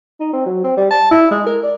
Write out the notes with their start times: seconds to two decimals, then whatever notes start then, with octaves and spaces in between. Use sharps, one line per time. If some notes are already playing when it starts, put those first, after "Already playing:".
0.20 D#4
0.33 C4
0.46 F#3
0.64 C4
0.77 G3
0.91 A5
1.11 E4
1.31 G#3
1.47 A#4
1.63 D5